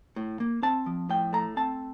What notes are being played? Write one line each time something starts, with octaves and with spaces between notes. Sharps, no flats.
A2
A#3
C4 A5
F3
A2 G5
A3 A#5
C4 A5